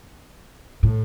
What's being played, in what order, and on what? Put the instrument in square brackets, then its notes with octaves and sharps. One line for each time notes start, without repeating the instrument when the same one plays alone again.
[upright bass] A2